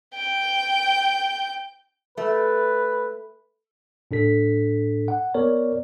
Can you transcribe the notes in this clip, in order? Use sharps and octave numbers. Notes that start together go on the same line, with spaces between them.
G5 G6
A3 B4
A2 D4 A4 B6
F#5
B3 A#4 C#5 D5